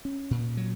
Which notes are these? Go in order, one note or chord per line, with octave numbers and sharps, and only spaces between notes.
C#4
A#2
F#3